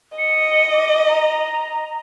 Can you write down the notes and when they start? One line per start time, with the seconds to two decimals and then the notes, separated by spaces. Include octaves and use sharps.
0.18 D#5 C#7
0.73 D6
1.08 A#5